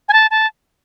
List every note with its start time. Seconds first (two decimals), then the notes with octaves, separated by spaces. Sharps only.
0.09 G#5
0.13 A5
0.31 A5